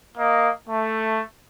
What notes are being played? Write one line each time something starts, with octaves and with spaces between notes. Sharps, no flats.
A#3 D#5
A3